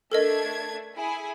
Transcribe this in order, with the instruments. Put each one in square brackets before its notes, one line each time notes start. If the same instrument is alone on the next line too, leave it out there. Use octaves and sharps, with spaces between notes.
[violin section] A3 D4 G#6 [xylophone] A4 A#4 D#5
[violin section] E4 G#4 G#5